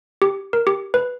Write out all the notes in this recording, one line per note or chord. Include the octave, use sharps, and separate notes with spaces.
G4
A#4
G4
B4